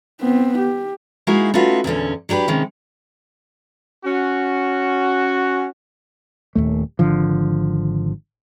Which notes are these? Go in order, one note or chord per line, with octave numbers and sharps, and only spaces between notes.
B3 C4
G4
G#3 A#3 D#4 E4 F#4 G#4
A3 C#4 D#4 F4 F#4 B4
E2 A#2 D3 C#4
F#3 D4 G4 G#4 B4
C3 D#3 G#3 C#4
C#4 F#4
D#1 D#2 A3
G#1 D3 F3